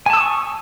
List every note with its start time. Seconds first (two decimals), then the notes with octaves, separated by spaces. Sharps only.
0.06 G#5
0.10 A5
0.13 E6
0.17 D#6
0.20 C#6